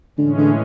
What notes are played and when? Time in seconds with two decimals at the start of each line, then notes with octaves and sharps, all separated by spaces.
0.18 A2 D3 E3 G#3 C#4
0.38 D3